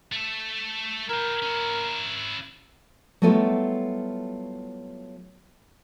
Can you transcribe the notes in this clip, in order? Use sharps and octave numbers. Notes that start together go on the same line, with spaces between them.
A3 A4
E4 A#4 G5
C#4 E4
F#3 G3 A3 B3 E4 F4